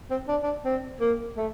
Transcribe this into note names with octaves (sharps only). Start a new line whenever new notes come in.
C4
D4
D4
C4
A#3
A3